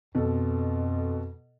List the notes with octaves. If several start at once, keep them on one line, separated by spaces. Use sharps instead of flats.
F2 B2 A4